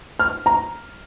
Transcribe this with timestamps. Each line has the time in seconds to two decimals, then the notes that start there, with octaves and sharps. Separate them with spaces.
0.19 F6
0.46 A#5